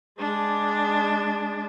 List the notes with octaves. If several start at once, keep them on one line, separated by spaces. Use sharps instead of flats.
G#3 D4